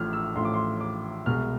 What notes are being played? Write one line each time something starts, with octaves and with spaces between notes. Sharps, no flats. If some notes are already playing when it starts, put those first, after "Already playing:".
Already playing: A1 A2 F3 F6
E6
A1 A2 F3 C6
D6
C6
D6
C2 B2 G#3 F6